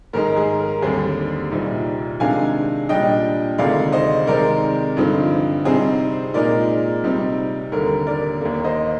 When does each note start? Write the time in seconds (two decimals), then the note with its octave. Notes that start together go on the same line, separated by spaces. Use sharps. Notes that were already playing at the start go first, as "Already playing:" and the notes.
0.13 G#2 D#3 G#3 D#4 A#4
0.36 G#4
0.59 A#4
0.82 D#2 D3 G3 C4 G#4 C5
1.52 C2 A#2 G3 C4 D#4
2.20 C3 D#3 G#3 D4 F5 G#5
2.89 A#2 G3 D4 D#5 G5
3.58 D2 C3 D#3 G#3 D5 F5
3.92 C5 D#5
4.27 C3 D#3 G#3 C4 A#4 D5
4.97 G2 D3 F3 C4 D#4
5.65 C3 G3 C4 D#4 G#4 C5
6.34 A#2 G#3 D#4 A#4 D5
7.04 C3 G3 C4 D#4
7.72 D#2 D3 G3 A#4
8.07 A#4 D5
8.41 D#2 D#3 A#3
8.64 C5 D#5